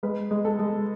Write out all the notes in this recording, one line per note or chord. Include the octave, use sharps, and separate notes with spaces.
G#3 B4
G#3
A4
G#3